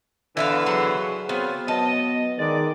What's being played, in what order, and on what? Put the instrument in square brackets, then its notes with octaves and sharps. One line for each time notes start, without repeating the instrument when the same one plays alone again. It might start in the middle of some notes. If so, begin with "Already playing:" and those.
[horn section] D3 E3 B3 [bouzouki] E4 E5 F5
[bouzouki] F#3 C5 F#5 [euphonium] G#4
[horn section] F#3 C4 F4 [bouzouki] B3
[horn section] F#3 D#5 [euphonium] B3 [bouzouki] A5
[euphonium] D#3 [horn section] G#3 D5